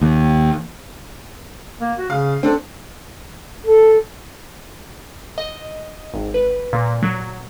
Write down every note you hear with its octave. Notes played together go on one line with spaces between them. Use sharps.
D#2
A#3
F#4
C#3 F5
C4 D4 A4
A4
D#5
G#1
B4
A#2
F#3